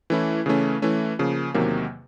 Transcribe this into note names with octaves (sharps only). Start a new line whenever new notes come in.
E3 A3 C#4 E4
C#3 E3 A3 C#4
E3 A3 C#4
C#3 F3 A#3
E2 C3 D#3 F#3 A#3